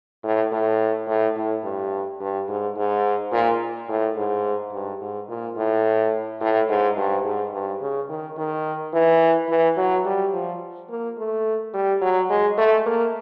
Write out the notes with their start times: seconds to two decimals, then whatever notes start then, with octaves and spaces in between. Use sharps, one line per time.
0.24 A2
0.52 A2
1.07 A2
1.36 A2
1.64 G2
2.20 G2
2.48 G#2
2.77 G#2
3.32 A#2
3.88 A2
4.16 G#2
4.73 G2
5.01 G#2
5.29 A#2
5.57 A2
6.41 A2
6.69 G#2
6.97 G2
7.25 G#2
7.53 G2
7.81 C#3
8.09 D#3
8.37 D#3
8.94 E3
9.49 E3
9.77 F#3
10.05 G3
10.33 F3
10.89 A#3
11.18 A3
11.74 G3
12.02 F#3
12.30 G#3
12.58 A3
12.86 A#3